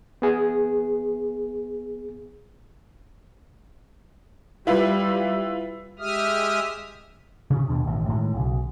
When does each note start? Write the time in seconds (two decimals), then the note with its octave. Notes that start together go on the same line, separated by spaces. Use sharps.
0.22 B3 G#4
4.67 G3 E4 F4 B4
5.99 G#3 G4 E5 D#6 F6
7.50 C3
7.68 D#2 B2 D4
7.86 A1 G2 D#3
8.09 A2 D#3 G#3
8.34 B1 C#3